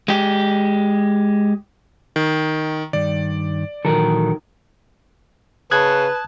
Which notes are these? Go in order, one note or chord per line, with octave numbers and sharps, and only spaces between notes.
G#3 G4
D#3
G2 D#3 D5
A#2 D#3 E3 F#3 A4 A#4
C#3 B4 A5 D#6 F#6 G#6